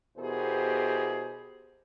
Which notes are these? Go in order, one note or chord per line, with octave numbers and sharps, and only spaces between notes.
E2 B2 G4 G#4 A#4 C5